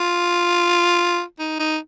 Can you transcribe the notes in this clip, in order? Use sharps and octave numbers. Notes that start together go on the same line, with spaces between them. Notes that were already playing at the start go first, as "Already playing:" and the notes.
Already playing: F4
D#4
D#4